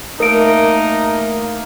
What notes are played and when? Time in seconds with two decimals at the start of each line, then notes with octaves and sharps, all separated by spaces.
0.20 A3 A#3 D#4 A#4 E5 D7